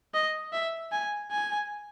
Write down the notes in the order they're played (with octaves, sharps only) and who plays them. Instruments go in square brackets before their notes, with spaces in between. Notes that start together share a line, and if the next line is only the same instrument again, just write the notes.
[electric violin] D#5
E5
G#5
G#5